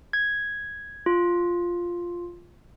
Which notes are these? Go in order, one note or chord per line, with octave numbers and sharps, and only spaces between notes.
G#6
F4